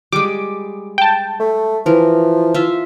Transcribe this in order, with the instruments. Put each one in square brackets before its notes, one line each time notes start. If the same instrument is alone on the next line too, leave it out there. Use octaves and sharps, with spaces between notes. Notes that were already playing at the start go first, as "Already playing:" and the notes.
[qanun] G3 G#3 [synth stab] D6
[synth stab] G5 A5
[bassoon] A3
[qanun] E3 A#4 [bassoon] F3
[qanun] F4 E5